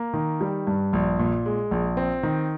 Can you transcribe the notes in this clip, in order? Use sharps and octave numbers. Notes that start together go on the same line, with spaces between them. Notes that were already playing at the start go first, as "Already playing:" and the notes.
Already playing: A#3
D#3
G3
G2
A#1
A#2
G#3
A#1
C4
D#3